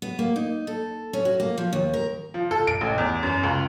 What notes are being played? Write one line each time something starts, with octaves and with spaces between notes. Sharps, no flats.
B3
A#3
D#4
A4
C#4
F#4
A#3
F3
D#2
A#4
F3
A4
D7
A1
E2
F#2
C#2